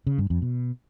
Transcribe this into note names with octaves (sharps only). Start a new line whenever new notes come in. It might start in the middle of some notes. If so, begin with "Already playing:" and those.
C#3
G2
F2
B2